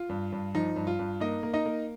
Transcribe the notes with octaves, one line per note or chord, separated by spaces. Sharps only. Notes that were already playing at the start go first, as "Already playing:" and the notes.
Already playing: F4
G2
G2
F3 D#4
G2
F4
G2
A#3 D#4 D#5
A#3
D#4 D#5
A#3